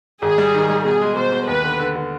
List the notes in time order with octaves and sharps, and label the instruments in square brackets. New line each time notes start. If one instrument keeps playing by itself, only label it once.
[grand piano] G#1 [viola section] G#4
[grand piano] G3
D#3
G3
[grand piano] B2 [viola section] G#4
[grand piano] G#3
[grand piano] B2 [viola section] C5
[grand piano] B2
[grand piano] D#2 [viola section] B4
[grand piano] D3
D3
D3